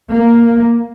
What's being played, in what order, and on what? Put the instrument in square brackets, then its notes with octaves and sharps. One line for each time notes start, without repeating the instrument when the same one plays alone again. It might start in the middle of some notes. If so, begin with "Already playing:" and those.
[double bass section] A#3